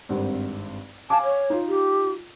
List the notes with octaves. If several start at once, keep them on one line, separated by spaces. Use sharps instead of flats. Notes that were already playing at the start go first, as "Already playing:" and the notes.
G#1 G2 C4
F5 G#5 A5 D6
C#5
D#4 F4
G4